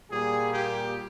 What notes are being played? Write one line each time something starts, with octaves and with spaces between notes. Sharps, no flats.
A#2 G3 A#3 G#4
G4